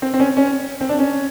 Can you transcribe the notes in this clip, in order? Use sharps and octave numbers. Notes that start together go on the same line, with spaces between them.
C4
C4
C#4
C#4
C4
D4
C#4